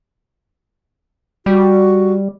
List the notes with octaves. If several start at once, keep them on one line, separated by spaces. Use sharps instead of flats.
G3 F#4